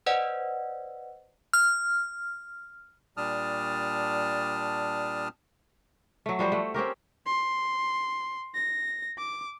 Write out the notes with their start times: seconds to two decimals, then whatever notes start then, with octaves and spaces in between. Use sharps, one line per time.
0.06 B4 C5 D5 D#5 F#5
1.53 F6
3.17 A#2 G3 D4 A5 D#6 F6
6.26 F#3 A3
6.39 F3 G3 F#4 C5
6.52 A3 F#5
6.74 C4 C#4 G4 A#4
7.26 C6
8.55 A#6
9.18 D6